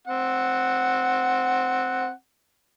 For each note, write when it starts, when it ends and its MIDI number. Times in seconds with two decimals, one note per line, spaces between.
0.07 2.10 60
0.07 2.10 78